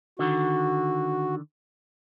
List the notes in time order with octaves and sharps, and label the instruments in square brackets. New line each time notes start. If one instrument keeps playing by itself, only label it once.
[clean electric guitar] D3 D#3 [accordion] F#4